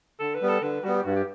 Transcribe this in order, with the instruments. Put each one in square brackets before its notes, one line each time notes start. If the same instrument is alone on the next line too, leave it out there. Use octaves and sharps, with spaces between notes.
[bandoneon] D3 [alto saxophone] A4
[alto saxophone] B4
[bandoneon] G3 B3
[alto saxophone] A4
[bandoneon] D3 [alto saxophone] B4
[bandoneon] G3 B3 [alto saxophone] F#4
[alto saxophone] G4
[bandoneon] G2 [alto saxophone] F#4
[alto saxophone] G4